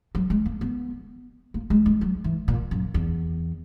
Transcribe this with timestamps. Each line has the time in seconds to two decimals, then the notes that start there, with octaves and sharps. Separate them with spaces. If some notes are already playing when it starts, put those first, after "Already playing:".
0.15 F#3
0.30 G#3
0.46 A#3
0.61 B3
1.54 A#3
1.70 G#3
1.86 G#3
2.01 F#3
2.24 E3
2.48 A#2
2.71 F#2
2.94 E2